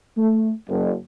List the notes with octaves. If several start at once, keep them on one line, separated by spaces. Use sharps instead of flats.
A3
F#1